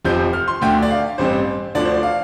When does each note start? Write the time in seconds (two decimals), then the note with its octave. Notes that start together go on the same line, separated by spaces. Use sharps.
0.05 F1 F2 C3 F3 C4 G6
0.33 F6
0.48 C6
0.62 D2 D3 A3 D4 G5
0.82 D5
0.90 F5
1.18 A1 G2 G3 C4 C5
1.75 D2 D3 F3 D4 D5
1.85 C5
1.94 D5
2.03 F5